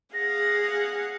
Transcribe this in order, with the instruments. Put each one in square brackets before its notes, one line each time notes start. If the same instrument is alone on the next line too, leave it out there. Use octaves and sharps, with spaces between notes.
[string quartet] G#4 F5 F#5 [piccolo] A#6